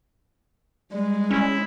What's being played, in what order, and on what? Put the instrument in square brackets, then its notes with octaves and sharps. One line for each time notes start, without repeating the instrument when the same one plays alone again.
[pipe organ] G3 [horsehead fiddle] G#3
[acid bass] C#4 [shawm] E4